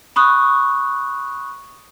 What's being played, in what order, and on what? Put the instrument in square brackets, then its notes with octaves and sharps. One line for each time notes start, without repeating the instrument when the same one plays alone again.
[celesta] B5 C#6 D#6 F#6